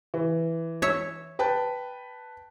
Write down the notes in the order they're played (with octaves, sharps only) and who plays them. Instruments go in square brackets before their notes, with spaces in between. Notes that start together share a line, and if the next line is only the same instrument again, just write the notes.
[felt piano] E3
[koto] C#5 E5
[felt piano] B4 G5 A5